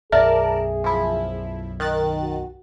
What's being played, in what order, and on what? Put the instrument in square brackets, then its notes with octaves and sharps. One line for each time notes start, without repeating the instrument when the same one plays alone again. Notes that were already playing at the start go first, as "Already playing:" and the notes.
[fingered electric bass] B1 F#2 [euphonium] G#4 [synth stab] A#4 D5 A5 [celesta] E5
[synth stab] F3 E4
D#3 F#6 A6
[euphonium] F#4